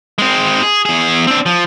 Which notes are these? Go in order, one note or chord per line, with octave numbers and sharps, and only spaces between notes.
G#3 C4
G#4
E2 G#4
C4 D4
F3